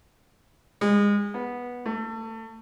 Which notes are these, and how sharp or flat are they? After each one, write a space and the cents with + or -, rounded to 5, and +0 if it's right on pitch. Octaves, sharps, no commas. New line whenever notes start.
G#3 -30
B3 -10
A3 +30